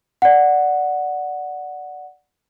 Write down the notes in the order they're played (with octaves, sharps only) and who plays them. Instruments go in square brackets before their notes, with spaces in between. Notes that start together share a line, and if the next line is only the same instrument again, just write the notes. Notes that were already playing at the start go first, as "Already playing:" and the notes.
[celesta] D5 F#5